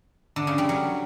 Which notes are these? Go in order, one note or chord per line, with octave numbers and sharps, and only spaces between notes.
D3
C#3
G3
F#3